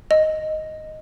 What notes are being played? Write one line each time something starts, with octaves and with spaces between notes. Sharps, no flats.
D#5